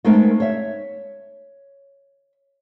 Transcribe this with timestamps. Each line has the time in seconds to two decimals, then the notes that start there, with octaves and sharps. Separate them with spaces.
0.05 G#3 A3 B3 C4 D#4 A#4
0.40 C#5 E5